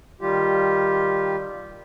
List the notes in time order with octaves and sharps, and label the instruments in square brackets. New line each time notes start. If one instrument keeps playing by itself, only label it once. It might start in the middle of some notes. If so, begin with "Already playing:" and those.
[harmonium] D#3 G3 F4 G4